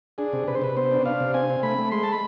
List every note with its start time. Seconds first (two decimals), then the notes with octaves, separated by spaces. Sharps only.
0.18 D4 G#4
0.33 C3
0.47 C3 B4
0.55 C5
0.61 C3 B4
0.77 B3 C5
0.91 D4
1.06 D4 F5
1.20 C3
1.34 C4 G#5
1.49 C4
1.63 A3 B5
1.78 A3
1.92 G#3 C6
2.03 A5
2.12 B5